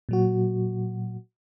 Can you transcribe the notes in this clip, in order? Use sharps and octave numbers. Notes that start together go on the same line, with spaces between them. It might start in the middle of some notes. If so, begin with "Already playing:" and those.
A#2 F#3 F#4